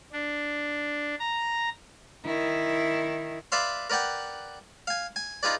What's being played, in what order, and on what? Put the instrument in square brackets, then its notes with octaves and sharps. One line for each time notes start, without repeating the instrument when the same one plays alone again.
[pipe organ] D4
A#5
[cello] D#3 E4
[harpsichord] B4 D5 E5 F5 C6
A#4 B4 D5 F#5 G5
F5 G#5
G#5
D#4 F4 G#4 B4 D5